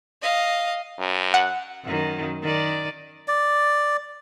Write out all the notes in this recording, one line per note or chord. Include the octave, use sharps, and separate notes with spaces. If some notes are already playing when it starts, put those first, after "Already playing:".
D#5 F5
F#2
F#5
F#2 D#3
D#3 D5
D5